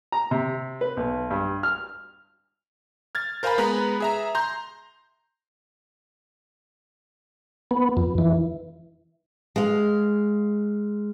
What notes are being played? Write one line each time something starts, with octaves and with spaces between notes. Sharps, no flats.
A#5
C3
B4
B1
G2
F6
F6 G#6 A6
A#4 C5 F5 G#5 A#5 B5
G#3 B3 B4 A#5 B5
G#4 E5 A#5
A#5 C6 G6
B3
F2
E3
G#3 F5